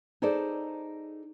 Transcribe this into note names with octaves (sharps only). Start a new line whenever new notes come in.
D#4 G#4 A4 C5 D5